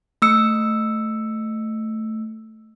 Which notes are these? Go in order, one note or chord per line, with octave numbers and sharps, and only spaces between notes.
A3 E6 C#7